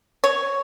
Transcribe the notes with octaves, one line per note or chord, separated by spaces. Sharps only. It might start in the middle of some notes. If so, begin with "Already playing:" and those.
C#5